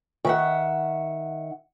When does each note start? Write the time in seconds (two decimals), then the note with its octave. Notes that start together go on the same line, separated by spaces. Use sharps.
0.25 D#3 E5 F#5